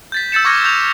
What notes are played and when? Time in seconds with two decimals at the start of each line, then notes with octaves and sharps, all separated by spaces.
0.12 G6 A6 B6
0.32 E6 G6 A6 C#7 E7
0.45 C#6 D6 F6 G#6 A#6 C#7
0.65 G6 E7 F7